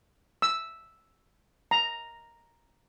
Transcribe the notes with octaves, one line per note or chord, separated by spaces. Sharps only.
E6
A#5